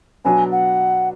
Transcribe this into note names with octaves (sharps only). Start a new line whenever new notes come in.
B2 F#3 B3 D4 G#5
F#5